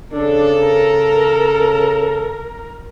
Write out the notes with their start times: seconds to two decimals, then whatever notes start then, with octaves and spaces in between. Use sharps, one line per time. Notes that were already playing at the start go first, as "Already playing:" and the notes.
0.13 C#3 D4 A4
0.60 A#4